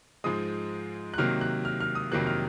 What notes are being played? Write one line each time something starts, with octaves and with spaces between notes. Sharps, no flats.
G#2 F3 G#3 D#6
F#6
C3 D#3 F#3 A#3 F6
F#6
F6
F6
D#6
F2 C3 D#3 F#3 A#3 F#6
F6